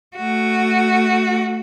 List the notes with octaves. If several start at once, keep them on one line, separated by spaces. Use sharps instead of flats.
A3 F#4